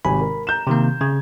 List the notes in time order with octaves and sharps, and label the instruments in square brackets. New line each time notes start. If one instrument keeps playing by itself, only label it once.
[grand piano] G#1 C3 G#5 [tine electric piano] B5
[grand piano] A#4
A#5 G6 E7
[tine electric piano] C3 D#3 A#3
[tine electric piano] C#3 [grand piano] G#6